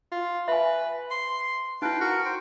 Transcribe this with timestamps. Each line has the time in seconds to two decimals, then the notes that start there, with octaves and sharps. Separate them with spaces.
0.12 F4
0.48 B4 E5 G#5
1.11 C6
1.82 D#4 E4 B4 F5 G5
2.01 F#4 A#4
2.25 C5 G5